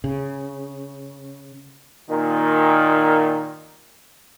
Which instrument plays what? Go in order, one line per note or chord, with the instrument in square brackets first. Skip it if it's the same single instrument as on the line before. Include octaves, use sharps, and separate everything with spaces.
[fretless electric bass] C#3
[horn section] A#2 D#3